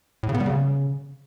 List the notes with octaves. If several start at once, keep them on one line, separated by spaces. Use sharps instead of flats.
A2
C#3
B3
G3
C#3